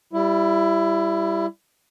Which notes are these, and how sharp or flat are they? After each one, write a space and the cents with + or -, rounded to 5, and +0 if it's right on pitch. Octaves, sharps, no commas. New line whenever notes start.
G3 +0 E4 +20